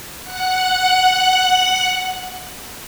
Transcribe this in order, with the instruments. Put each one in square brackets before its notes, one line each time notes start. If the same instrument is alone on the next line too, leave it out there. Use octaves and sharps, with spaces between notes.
[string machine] F#5 F#6